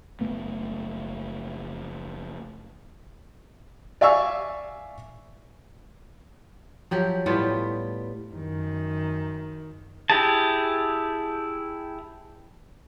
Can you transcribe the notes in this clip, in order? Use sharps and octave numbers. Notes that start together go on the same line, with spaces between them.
F#1 A3 B3
D5 E5 F5 G#5 C#6 E6
F3 F#3 G4
A2 G3 B3 F4
F#2 D#3
E4 G4 G#4 A5